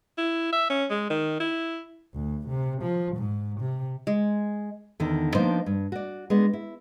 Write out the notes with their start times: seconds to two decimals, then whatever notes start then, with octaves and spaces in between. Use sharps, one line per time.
0.18 E4
0.53 E5
0.70 C#4
0.90 G#3
1.10 D#3
1.40 E4
2.14 D2
2.49 C3
2.82 F3
3.16 G#2
3.61 C3
4.07 G#3
5.00 E2 D3 D#3
5.35 F3 A#3 B3 D4 D#4 C5
5.66 G2
5.92 F#4 D5
6.30 G#3 B3 D4
6.53 E4